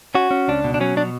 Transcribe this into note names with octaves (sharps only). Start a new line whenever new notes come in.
C#4 F#4
C#4
C#2 D4
B2
D4
F#3 C#4
B2 D4